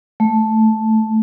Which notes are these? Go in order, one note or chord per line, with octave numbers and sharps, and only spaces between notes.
A3